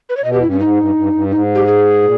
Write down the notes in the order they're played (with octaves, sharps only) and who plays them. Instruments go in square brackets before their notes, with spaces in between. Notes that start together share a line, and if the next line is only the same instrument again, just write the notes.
[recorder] B4
C#5
[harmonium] B2 [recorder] D#5
[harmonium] E2 [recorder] G4
[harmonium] G2 [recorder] E4
[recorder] C#4
[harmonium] G#2 [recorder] D#4
[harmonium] G2
G2
G2
[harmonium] G#2 [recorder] D#4
[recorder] G4
G#4
[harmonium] A#2